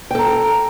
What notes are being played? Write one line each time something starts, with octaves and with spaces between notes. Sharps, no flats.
A4 G5 A#5